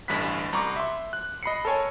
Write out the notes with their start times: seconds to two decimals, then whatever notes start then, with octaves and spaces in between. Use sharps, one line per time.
0.08 A1 D2 G2 B5 F#6 B6
0.53 C2 A#5 B5 C#6 D6
0.76 E5 C6
1.13 F#6
1.43 D#5 B5 C7 C#7
1.65 A4 A#4 C#5 G#5